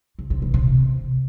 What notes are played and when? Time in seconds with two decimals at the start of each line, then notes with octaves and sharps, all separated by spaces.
0.19 C3
0.30 C3
0.42 E3
0.54 C3